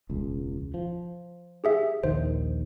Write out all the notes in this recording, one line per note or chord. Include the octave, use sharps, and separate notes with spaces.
E1 C#2
F3
G4 G#4 E5
A#1 D#2 D#3 C5